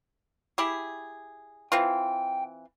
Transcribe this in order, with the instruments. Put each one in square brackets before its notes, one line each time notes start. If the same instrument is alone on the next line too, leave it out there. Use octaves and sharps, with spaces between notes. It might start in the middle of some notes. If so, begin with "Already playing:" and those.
[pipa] E4 G4 G#4
[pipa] E3 C4 F4 [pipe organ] G5